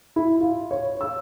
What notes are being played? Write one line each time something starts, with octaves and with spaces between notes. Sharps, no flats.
E4
F4
C#5
E6